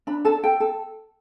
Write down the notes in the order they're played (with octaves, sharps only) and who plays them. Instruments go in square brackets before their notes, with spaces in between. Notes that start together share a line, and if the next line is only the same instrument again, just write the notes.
[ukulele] D4 B5
A4 A5
A4 G5
A4